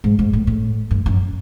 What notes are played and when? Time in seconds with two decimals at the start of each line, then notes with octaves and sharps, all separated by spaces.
0.04 G#2
0.19 G#2
0.33 A2
0.47 A2
0.91 G2
1.06 F#2